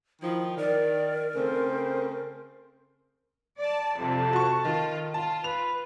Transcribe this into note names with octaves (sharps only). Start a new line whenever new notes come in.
D#3 F3 E4
D#3 A#4 D5
C#3 A3 C4 C5
D5 A5
F2 C3 A5
F#4 C#6
D#3 F4
F4 A5
B4 F7